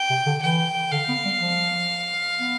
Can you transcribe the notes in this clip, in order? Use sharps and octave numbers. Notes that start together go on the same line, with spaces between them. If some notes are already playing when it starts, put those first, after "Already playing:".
Already playing: G5
C3
D3
E3 G5
D3 F5
B3
G3
F3
B3